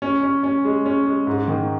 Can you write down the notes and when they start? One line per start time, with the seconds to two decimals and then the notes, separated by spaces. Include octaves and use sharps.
0.02 C#4
0.23 C#4
0.43 C#4
0.65 G#3
0.86 C#4
1.06 G#3
1.27 G#2
1.48 D#3